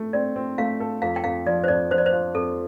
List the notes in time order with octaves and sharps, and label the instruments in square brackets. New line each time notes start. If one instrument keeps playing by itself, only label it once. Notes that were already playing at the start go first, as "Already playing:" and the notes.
Already playing: [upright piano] A3
[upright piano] C4 [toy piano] D5
[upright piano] C4
[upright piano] A3 [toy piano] F5
[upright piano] A4
[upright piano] F2 [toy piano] F5
[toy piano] G5
[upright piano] F2 [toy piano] F5
[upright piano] F3 [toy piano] D5
[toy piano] C5
[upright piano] F2 [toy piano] D5
[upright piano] F3 [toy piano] C5
[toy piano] D5
C5
[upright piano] F4
[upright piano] F2 [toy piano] A4